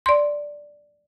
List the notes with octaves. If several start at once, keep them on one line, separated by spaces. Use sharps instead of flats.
D5 C6